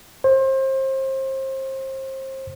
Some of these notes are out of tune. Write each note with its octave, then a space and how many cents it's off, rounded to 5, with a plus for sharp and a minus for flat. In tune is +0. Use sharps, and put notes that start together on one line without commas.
C5 +30